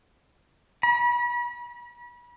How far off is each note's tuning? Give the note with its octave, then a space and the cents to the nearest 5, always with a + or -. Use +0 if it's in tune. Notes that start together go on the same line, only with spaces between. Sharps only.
B5 -35